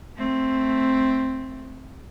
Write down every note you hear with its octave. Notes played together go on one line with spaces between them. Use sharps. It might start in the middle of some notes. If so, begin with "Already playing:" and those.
A3 C4